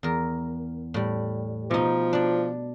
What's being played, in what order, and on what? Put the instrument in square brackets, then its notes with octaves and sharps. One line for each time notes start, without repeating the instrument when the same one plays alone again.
[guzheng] E2 A#4
A2 G3
[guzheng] B2 D#4 [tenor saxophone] F3
[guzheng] D4 D5